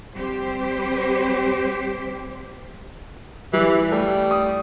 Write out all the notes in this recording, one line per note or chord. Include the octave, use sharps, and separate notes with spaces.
G3 C4 G4 C5
E3 G3
G3 A3
D#6